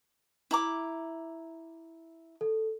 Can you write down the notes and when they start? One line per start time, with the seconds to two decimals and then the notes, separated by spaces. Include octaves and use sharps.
0.51 E4 A#5 D6
2.41 A4